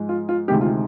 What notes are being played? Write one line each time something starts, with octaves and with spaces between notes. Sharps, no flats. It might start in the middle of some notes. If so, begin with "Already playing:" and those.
Already playing: G#2 F3 G#3
F4
F4
D2 C3 D#3 G#3 G4
F4